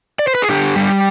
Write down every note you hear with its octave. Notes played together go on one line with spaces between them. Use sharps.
D5
C5
B4
G#4
D3 G4
G3